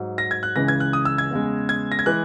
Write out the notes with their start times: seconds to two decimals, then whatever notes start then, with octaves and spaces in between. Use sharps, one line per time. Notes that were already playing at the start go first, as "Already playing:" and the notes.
Already playing: G#2 F#3
0.18 A#6
0.31 G#6
0.43 F#6
0.56 C#2 C#3 E3 G#3 A#6
0.68 G#6
0.80 F#6
0.93 D#6
1.05 E6
1.18 G#6
1.31 E2 C#3 G#3
1.69 G#6
1.92 A#6
1.99 G#6
2.06 E3 G#3 F#6